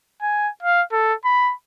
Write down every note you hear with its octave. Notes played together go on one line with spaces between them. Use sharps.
G#5
F5
A4
B5